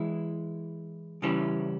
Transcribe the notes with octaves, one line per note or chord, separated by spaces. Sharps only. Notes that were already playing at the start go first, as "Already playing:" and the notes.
Already playing: E3 G#3 E4
C#3 E3 G3 C#4 E4